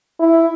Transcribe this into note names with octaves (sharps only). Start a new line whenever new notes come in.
E4